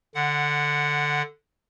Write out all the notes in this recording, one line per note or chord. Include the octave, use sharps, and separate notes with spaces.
D3 F#5